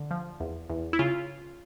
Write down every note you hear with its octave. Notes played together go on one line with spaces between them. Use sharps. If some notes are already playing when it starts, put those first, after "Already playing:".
Already playing: D3
F3
E2
E2
E4
C#3 F4